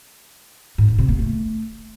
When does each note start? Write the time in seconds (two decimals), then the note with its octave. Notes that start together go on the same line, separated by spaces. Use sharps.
0.78 G#2
0.88 C3
0.99 C3
1.09 A#3
1.19 A3